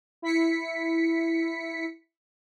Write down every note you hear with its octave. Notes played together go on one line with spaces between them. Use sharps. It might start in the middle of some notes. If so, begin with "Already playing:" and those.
E4 B6 C#7